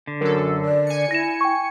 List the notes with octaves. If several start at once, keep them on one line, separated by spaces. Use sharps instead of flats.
D3
F#2 A4 A#4
D5
G#5 C#7
E4 A#6 E7
G5 C#6